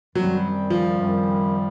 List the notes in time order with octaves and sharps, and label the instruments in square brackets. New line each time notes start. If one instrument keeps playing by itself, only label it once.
[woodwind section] F#2 D#3 G3 C4 [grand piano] F#3
[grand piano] F3
[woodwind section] F#2 D#3 G3 C4